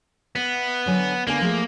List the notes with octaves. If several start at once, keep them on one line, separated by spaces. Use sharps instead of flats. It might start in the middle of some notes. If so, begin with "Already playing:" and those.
B3 E5
D3 F#3 G#5
D3 A#3 B3 G#5
F3 A3 G#4